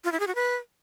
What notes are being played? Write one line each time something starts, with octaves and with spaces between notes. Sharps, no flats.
F4
E4
G#4
F#4
B4